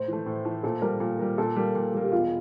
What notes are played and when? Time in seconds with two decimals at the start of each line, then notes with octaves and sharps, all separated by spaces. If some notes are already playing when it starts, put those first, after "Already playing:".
Already playing: A2 C5
0.08 E3 A3
0.26 A2
0.45 E3 A3
0.63 A#2 A4
0.82 G3 A#3 A#4
1.00 A#2
1.19 G3 A#3
1.38 A#2 A4
1.56 G3 A#3
1.75 A#2
1.94 G3 A#3
2.04 G4
2.12 E1 F4